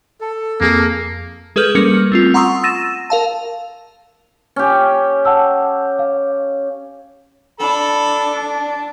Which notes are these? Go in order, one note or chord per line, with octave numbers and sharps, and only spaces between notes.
A4
F2 A#3 G#4
G#3 G#4 A4 B4 F6 G6
G3 A#3 C#4 A#4 F6 C#7
A3 C4 F4
F#5 A#5 C6 C#6 D#6 E6
E6 A6 A#6 D#7 E7
A#4 F5 A5
C#4 G4
F#5 A5 E6
F5
D4 A4 B5